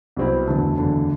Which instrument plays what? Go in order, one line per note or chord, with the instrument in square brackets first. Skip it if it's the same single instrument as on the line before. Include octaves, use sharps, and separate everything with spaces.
[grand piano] C2 B2 F#3 C4 E4
F#1 E2 D3 F#3 A3
F#1 E2 D3 F#3 A3